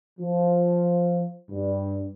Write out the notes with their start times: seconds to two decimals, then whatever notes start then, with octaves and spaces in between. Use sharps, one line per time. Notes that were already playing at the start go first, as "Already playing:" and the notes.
0.20 F3
1.51 G2